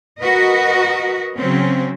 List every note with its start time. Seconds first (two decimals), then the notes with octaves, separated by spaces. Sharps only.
0.20 F#4 A#4 B4 D#5
1.37 C#3 F#3 C4 C#4